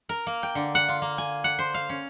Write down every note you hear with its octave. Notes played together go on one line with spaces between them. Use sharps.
A#4
A#3
G5
D3
F#5
F4
A#3
G#5
F#5
C5
F5
C#4